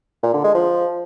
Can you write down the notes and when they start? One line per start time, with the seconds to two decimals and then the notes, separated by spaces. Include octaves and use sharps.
0.23 A#2
0.34 D3
0.44 G#3
0.55 F3